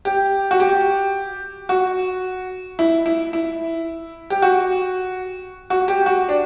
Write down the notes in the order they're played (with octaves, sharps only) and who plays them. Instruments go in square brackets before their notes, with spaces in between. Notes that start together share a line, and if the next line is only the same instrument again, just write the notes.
[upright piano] G4
F#4
G4
F#4
E4
E4
E4
G4
F#4
F#4
G4
F#4
D4